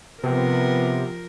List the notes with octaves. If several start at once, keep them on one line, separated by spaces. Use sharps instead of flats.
C3 F3 B3 A#4 B4